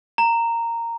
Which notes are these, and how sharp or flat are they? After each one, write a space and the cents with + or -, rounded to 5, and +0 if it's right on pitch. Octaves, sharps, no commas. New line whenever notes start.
A#5 -10